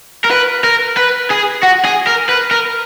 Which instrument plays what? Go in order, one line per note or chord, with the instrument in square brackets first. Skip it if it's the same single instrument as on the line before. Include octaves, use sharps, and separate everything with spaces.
[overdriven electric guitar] A#4
B4
A#4
B4
G#4
F#4
G#4
A#4
B4
A#4